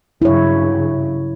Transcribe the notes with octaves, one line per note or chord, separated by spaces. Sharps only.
G2 C#3 F#3 E4 C#5